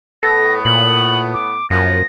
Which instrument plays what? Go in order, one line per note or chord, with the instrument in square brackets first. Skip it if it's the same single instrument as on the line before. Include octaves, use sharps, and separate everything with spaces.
[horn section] A2 B3 [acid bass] A4 [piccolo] A#6
[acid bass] A#2 [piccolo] F#7
[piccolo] D6
[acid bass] F#2 [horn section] F3 A#3 B3 [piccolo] A#6